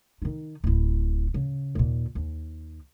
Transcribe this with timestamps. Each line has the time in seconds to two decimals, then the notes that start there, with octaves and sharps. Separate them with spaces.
0.22 D#3 D#4
0.64 D1 E4
1.34 C#3
1.75 D#2 A#2
2.15 D#2